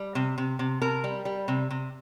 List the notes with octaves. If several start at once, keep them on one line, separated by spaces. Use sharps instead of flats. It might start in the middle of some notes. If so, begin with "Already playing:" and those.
Already playing: G3
C3
C3
C3
C3 A#4
G3
G3
C3
C3